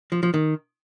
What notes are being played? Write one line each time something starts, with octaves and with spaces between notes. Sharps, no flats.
F3
F3
D#3